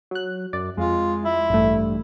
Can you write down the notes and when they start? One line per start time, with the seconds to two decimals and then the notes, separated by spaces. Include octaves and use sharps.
0.11 F#3 F#6
0.53 F#2 D5
0.77 F2 G#3 F4
1.25 E4
1.50 A1 G2 A3